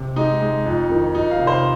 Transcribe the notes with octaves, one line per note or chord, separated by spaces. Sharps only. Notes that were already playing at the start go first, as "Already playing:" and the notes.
Already playing: C3
G#3 D#4
G#3
F2
D#3
F2 D#4
F5
C3
C5